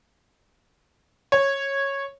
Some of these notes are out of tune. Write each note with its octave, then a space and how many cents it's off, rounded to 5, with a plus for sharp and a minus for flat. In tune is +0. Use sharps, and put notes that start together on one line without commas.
C#5 -10